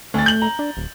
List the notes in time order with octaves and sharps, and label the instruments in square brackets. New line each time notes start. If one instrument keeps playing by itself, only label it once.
[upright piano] D2 A6 [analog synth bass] A3
[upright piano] G6 F#7
A#5
[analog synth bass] D4
D#1